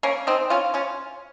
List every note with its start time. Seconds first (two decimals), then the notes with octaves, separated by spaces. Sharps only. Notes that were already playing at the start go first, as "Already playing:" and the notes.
0.03 A#3 C#4
0.27 C4 D#4
0.50 C#4 F4
0.74 C#4 F4